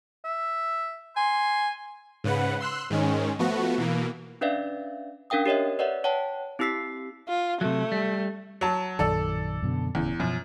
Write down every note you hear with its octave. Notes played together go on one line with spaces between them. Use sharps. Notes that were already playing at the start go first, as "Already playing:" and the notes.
E5
G#5 C6
G#2 C#3 B4 F#5
C6 E6 F#6
G#2 D#3 G#3 C#4
F3 A3 B3 F#4
B2 E3 A#3
C#4 D4 B4 D5 E5 F5
C#4 D4 A#4 F5 G5 D#6
G4 A#4 C#5 D#5 E5
B4 C#5 D5 E5 F#5
C#5 F#5 G5 A5
C4 E4 G4 E6 B6 C7
F4
C3 F#3 A3
G3
F#3 A5
A#1 F#2 D#3 A4 D5 E6
F#2 B2 D3
D1 E2 C#3
F#2 B2 F3